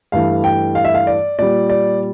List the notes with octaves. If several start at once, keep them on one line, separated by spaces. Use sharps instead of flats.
G2 E3 A3 F5
G5
F5
E5
F5
D5
A#2 G3 D5
D5